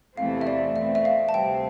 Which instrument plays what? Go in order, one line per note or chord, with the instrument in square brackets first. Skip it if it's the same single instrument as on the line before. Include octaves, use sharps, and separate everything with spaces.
[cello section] E2 C3 E3 A3 C4 [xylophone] F5
[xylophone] E5
D5
[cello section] B2 A3 C4 [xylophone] E5
[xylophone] E5
F5
A5
[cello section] D2 C3 G3 C4 [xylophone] G5